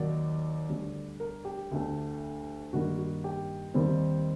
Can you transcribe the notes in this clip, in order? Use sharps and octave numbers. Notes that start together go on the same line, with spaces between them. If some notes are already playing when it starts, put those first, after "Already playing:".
Already playing: D#2 D#3 F#3 D5
D2 D3 G3
A#4
G4
D2 D3 A3
G2 D#3 G3 A#3 F#4
F#4
G4
D#2 D#3 G3 C4